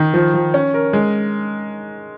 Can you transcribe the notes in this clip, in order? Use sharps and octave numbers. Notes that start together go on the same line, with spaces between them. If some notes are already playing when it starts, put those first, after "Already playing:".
Already playing: D#3
F3
F3
C#4
A#4
G#3